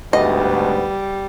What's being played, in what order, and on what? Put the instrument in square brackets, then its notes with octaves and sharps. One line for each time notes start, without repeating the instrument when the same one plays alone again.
[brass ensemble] D2 G#2 [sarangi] G3 [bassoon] B3 [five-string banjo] D#5